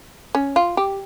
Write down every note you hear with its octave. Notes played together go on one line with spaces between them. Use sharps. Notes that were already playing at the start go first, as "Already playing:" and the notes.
C#4
F4
G4